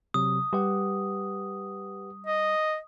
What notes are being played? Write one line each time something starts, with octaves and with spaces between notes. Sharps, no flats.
C3 F#3 D#6
G3 G4 B4 F#5
D#5